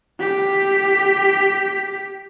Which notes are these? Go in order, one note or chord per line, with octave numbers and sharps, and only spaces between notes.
G4 B6